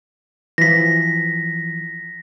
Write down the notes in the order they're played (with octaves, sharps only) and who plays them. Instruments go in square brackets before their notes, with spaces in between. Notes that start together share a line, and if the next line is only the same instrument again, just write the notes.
[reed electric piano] E3 F3 [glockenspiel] A#6 B6